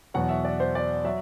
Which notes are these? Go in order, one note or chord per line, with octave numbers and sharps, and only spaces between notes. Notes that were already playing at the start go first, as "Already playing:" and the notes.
E2 B2 F#3 F#5
E5
D5
C5
D5
F#3 E5